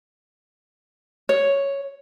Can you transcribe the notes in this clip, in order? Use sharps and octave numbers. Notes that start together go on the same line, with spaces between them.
C#5